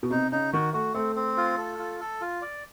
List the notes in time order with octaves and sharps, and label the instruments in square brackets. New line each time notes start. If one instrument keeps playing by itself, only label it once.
[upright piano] B2
[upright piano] C3 [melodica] D#4
[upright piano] C#3 [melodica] D#4
[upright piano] D#3 [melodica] F#4
[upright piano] A3 [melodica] F#4
[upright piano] A3 [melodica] C4
[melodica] C4
F4
A4
F4
A4
F4
D5